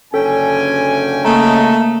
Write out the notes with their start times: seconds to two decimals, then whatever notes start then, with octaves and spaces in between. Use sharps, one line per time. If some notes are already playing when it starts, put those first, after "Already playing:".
0.14 F#1 D3 C#4 A4 G5 G#5
1.25 C#3 A3 A#3 D#5 A#5